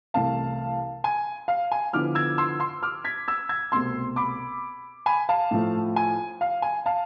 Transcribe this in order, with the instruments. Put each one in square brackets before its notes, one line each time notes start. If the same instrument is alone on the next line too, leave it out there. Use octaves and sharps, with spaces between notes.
[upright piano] C2 C3 E3 A3 E4 F5 A5
G#5
F5
G#5
D3 F3 B3 E4 D6 F6
E6 G#6
C6 E6
C6 E6
D6 F6
G#6 B6
E6 G#6
E6 G#6
C2 B2 A3 C4 C6 E6
B5 D6
G#5 B5
F5 A5
A2 F3 A3
G#5
F5
G#5
F5 A5